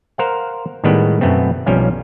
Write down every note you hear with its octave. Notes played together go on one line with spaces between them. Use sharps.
A#4 C5 F5 F#5
A2 D#3 G3 G#3 B3
F#2 B2 A3 B3 C4
B1 F3 G3 C#4 F5